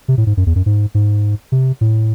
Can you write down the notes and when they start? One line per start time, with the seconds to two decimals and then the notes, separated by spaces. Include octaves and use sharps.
0.08 C3
0.18 A2
0.27 G#2
0.37 F#2
0.47 E2
0.56 F#2
0.66 G#2
0.95 G#2
1.52 C3
1.81 A2